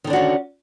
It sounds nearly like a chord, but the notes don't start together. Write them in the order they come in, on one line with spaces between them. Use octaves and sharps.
D#3 D3 D4 F#4 C#4